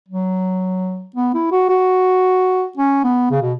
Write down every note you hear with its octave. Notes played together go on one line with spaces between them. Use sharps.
F#3
B3
E4
F#4
F#4
C#4
B3
C#3
B2